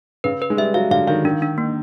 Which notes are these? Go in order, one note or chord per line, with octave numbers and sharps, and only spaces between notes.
C#3 B4
B4
G#3
G3 E5
F#3 F5
D3 F5
D#3 F5
D#3 D4
D4
A#3